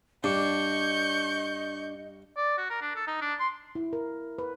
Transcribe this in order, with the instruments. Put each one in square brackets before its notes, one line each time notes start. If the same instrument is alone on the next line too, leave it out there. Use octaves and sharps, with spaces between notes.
[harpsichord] G2 [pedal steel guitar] D4 D6 [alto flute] D#5 [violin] C#6 G6
[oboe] D5
F#4
A#4
D4
A4
D#4
D4
C6
[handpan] E4
A#4
B4